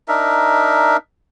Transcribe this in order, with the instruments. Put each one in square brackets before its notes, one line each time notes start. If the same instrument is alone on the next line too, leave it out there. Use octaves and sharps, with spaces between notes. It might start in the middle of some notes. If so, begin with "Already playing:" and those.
[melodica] D4 D#4 A#4 E5